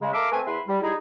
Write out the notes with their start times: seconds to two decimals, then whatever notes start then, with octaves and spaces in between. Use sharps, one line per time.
0.02 C#3 G#3
0.13 A4 A#4 E5 F5 D6
0.32 A3 C4 B4 G#5
0.46 E2 E4 B4 E5 B5 C6
0.68 G3
0.81 G3 D#4 E4 G#4